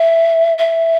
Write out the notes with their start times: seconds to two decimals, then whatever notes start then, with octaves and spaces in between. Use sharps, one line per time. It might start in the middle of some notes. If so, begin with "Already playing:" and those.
Already playing: E5
0.58 E5